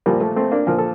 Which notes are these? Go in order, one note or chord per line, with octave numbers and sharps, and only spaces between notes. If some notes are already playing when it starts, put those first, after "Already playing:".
A#2 F3 G3 A#3
A3
A3 C4
A#3 D4
A#2 F3 A#4
A4